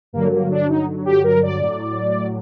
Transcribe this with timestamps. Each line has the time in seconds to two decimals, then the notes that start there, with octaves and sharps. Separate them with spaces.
0.13 G2 D3 F#3 A#3
0.32 A#3
0.50 D4
0.69 D#4
1.05 G4
1.24 A#4
1.43 D5
1.61 A2 F#3